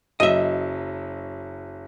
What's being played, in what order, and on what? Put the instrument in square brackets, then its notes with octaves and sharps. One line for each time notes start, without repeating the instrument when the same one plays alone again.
[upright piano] F#1 F#3 [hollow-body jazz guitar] D#5 E5